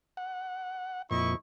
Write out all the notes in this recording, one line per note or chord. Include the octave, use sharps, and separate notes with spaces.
F#5
F2 A#2 E4 D#5 C#6